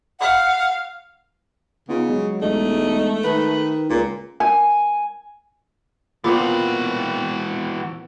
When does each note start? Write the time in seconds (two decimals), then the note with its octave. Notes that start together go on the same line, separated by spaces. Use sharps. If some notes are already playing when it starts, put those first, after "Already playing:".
0.20 F5 F#5
1.89 C#3 B3 D#4 F4
2.09 F#3 G#3
2.41 E1 A3 D#4
3.24 D#3 B4
3.90 C#2 A#2
4.40 G#5
6.24 A#2 E3 B3 C4 F#4